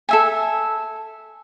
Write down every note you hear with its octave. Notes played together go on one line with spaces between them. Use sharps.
A4 E5 G#5